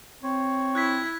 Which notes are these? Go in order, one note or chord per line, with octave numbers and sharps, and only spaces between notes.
C4 C#5
E4 F#6 G#6 B6